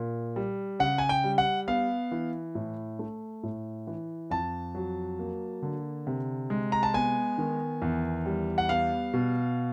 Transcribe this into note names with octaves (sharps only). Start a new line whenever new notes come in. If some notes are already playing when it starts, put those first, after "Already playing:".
Already playing: A#2
G3
C#3 F#5
G#5
G5
G3
F#5
B3 F5
E3
A2
A3
A2
E3
F2 A5
F#3
A#3
D3
C3
G#3
A#5
A5
B3 G#5
D#3
E2
G3
F#5
B3 F5
B2